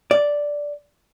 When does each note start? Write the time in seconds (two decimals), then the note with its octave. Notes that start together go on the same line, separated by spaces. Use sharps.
0.11 D5